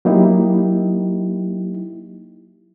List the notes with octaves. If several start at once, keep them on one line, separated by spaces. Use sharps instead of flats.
F#3 A#3 D#4 E4 G4